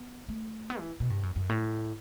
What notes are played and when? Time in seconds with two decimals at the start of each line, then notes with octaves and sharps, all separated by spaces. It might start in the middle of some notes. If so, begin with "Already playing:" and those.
Already playing: B3
0.29 A3
0.70 B3
0.79 E3
1.00 B2
1.10 G2
1.23 F#2
1.36 F#2
1.49 A2